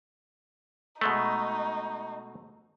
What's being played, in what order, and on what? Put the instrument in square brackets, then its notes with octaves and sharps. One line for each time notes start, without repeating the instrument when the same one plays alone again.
[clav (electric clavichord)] B2 G#3 A3 [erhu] D#4